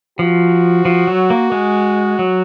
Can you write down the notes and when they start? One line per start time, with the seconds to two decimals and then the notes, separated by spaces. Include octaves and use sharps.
0.19 F3 F#4
0.85 F3
1.07 F#3
1.30 A#3
1.52 G#3
2.19 F#3